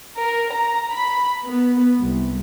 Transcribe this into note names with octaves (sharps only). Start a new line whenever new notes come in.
A#4
A#5
B5
B3
C2